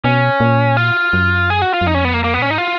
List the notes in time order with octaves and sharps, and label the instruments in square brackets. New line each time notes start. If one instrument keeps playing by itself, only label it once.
[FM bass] B2 [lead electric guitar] C#4
[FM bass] A#2
[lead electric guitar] F4
[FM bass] F#2
[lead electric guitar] G#4
F#4
F4
[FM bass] F#2
[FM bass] F2 [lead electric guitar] D#4
[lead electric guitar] C#4
B3
A#3
A#3
B3
[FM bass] A#2 [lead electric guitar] C#4
[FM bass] G#2 [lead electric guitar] D#4
[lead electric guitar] F4